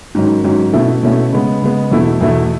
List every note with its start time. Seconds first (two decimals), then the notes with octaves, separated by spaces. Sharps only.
0.15 G#2 D#3 F#3 C#4
0.44 G#2 D#3 F#3 C#4
0.73 B2 A3 C#4 E4
1.03 B2 A3 C#4 E4
1.32 C#3 G#3 B3
1.62 C#3 G#3 B3
1.91 E2 B2 A3 E4
2.21 E2 B2 A3 E4